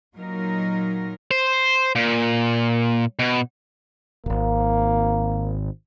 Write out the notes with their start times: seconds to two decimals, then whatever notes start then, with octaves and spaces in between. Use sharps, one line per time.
0.17 A#2 F#3 D#4 A#4
1.31 C5
1.95 A#2
3.19 B2
4.26 D#1 G#1 A#3